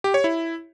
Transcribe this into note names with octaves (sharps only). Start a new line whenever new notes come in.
G4
C#5
E4